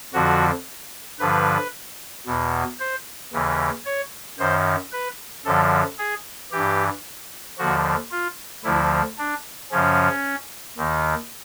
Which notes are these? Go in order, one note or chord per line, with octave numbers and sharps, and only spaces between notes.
F2 D3 F3 F#4
G2 D3 F3 B4
E2 B2
C5
D#2 C#3 E3
C#5
F#2 D#3 C5
B4
F#2 D3 F3 A4
G#4
G2 E3 G4
D#2 D3 F3 F#4
F4
D2 D3 F3 E4
D4
F#2 C#3 F3 C#4
D#2 D#3